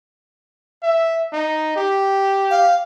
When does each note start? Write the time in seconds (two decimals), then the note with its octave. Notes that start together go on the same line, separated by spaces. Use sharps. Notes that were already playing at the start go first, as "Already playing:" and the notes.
0.83 E5
1.32 D#4
1.76 G4
2.51 F5